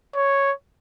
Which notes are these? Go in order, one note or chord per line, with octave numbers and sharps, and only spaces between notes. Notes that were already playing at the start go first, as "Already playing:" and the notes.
C#5